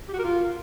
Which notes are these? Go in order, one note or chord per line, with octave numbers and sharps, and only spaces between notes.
G4
F#4
A#4
F4